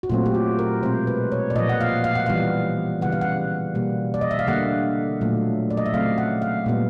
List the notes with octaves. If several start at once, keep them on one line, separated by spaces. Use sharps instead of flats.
F#4
A#2 F#3 A3 C4 F4
G4
F#4
A#4
B2 G#3 C4 C5
B4
C#5
D5
A#2 F3 A#3 D#5
F#5
F5
F5
F#5
E3 G3 B3 F5
C#3 E3 G3 B3 F#5
F5
F#5
B2 G3 A#3
D5
D#5
E5
F5
D3 G3 A#3 F#5
A#2 F#3 A3
D5
D#5
E5
C#3 F#3 A3 C4 F5
F#5
F5
A#2 G3 B3